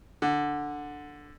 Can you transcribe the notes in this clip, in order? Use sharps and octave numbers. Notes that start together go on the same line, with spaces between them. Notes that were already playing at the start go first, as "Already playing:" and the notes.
D3